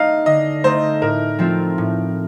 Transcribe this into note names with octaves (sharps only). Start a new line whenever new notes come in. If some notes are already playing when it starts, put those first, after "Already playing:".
Already playing: A3 D#4 F5
D3 D#5
A3 D#4 C5
A2 A#4
F3 A3 C4 F4
A2